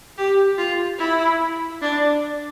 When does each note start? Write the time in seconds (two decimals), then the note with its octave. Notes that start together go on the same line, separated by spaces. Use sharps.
0.18 G4
0.58 F4
0.99 E4
1.82 D4